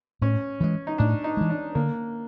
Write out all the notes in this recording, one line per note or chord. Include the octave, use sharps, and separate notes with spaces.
A2 C#4
E3 G#3
D#4
A2 D4
D#4
E3 G#3
D4
D3 A#3